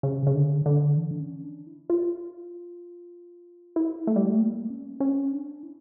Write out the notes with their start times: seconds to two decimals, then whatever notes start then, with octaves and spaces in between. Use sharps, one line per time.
0.03 C#3
0.27 C#3
0.35 D3
0.66 D3
0.96 E3
1.11 D4
1.20 C#4
1.44 D4
1.67 E4
1.90 F4
3.76 E4
4.07 A3
4.16 G3
4.26 A3
4.39 A#3
4.70 C#4
5.00 C#4
5.32 D4
5.63 E4